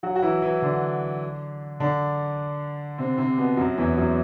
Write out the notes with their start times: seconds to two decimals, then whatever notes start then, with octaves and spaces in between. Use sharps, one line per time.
0.03 F#3 F#4
0.16 F#4
0.22 E3 E4
0.42 E3 E4
0.62 D3 D4
1.80 D3 D4
2.98 C3 C4
3.18 C3 C4
3.38 B2 B3
3.57 F#2 F#3
3.77 E2 E3
3.97 F#2 F#3